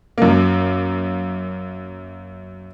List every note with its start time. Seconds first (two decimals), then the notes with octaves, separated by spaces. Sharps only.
0.18 F#2 A#3